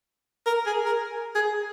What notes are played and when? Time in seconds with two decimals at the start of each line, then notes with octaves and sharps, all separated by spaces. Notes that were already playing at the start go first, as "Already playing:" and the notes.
0.46 A#4
0.66 G#4
0.86 A#4
1.35 G#4